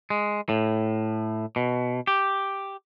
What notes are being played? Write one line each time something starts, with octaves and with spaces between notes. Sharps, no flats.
G#3
A2
B2
G4